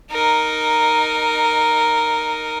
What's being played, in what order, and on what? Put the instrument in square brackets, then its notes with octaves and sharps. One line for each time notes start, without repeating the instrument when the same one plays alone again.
[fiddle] D#4 A#4